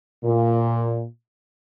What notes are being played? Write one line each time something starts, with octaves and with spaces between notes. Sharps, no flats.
A#2